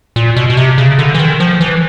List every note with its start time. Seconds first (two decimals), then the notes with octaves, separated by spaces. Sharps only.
0.16 A#2
0.37 B2
0.50 B2
0.57 C3
0.78 C#3
0.99 D3
1.14 E3
1.19 D#3
1.40 F3
1.61 E3